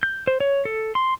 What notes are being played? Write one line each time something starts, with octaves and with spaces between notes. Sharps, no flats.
G6
C5
C#5
A4
C6